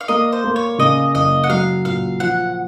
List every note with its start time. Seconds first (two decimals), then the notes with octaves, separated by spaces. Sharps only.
0.01 F5
0.08 A#3 D#5
0.32 C5
0.44 A#3
0.56 C#5
0.79 C#3 D#5
1.15 F#1 D#5
1.44 F#5
1.49 F#3 F5
1.85 A#2 F5
2.20 F3 F#5